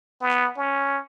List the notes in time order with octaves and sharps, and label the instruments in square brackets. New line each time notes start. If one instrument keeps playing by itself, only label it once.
[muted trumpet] B3
C#4